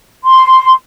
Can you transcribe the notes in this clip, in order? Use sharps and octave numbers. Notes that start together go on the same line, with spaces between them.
C6